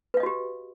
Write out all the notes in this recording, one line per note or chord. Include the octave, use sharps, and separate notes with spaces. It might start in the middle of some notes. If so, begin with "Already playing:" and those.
F#4 G4 B4 D#5 F5